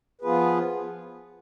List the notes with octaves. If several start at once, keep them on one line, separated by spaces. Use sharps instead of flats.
F3 B3 F4 G#4 B4